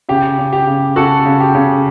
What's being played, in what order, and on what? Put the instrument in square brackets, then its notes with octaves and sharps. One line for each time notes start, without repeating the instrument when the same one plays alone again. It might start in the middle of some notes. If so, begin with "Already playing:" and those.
[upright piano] C#3 [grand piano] G4
[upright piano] C#3
[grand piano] G4
[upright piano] C#3
[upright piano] C#3 [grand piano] F#4 A4
[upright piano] C#3
[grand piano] G4
[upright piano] C#3